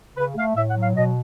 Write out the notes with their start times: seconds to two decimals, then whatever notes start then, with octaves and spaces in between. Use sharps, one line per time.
0.16 C#3 B4
0.36 A3 F5
0.56 A2 E5
0.69 F#5
0.76 F#3
0.82 F5
0.95 B2 D#5